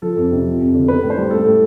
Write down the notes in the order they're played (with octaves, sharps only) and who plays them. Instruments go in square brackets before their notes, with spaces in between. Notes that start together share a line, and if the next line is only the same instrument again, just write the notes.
[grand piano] F3 A4
F2
C3
F3
F2
D3
B3 B4
A2
C5
G3
A3 A4
A2